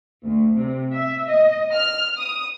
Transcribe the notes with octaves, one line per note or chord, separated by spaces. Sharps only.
D2
C3
E5
D#5
F6
D#6